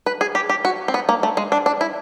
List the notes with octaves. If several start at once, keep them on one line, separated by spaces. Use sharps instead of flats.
B4
G#4
G4
G4
F#4
C4
B3
A#3
A3
G#3
D4
D4
E4